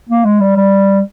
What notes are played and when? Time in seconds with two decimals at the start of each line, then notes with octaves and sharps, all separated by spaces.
0.09 A#3
0.25 G#3
0.40 G3
0.57 G3